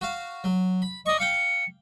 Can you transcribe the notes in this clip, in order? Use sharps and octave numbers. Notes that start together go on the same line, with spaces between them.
F#4 F5
F#3
B5
D5 D#5 C#6
F5 G5 C#7